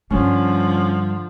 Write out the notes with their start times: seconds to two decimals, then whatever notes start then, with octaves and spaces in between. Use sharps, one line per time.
0.10 G2 D3 F3 G3 C#4